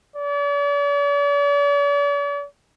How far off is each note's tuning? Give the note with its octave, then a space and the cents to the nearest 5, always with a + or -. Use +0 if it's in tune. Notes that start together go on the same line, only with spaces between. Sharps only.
D5 -45